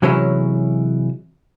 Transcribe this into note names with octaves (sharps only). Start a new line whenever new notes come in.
C3 E3 F#3 G#3 C#4 E4